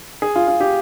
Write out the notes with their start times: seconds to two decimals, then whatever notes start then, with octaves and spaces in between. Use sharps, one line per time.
0.22 G#4
0.36 F4
0.48 F4
0.61 G4